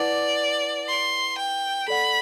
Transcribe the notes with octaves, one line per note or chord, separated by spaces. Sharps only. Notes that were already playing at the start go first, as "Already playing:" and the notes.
Already playing: E4 B4 D5 F#5 A5 D6
C6
G5
A4 D5 F#5 B5